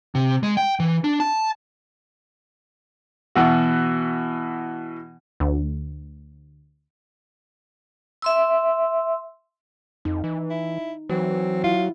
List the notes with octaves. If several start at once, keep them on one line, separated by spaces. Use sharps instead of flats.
C3
G#3
G5
E3
D4
A5
B2 E3 F#4
D2
E5 C6 E6
F2 D#4
E3
E4
E3 F#3 C4
E4 F4